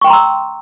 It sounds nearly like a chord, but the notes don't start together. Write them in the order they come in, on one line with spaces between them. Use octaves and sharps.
C#6 G5 C6 A#5 E6